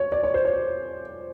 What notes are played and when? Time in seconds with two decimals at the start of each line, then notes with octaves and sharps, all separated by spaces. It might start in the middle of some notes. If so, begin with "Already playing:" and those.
Already playing: C#5
0.12 D5
0.23 C#5
0.34 C5
0.45 C#5